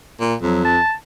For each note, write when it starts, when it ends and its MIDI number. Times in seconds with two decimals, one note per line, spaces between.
0.20 0.34 46
0.42 0.79 41
0.42 0.62 54
0.65 0.94 81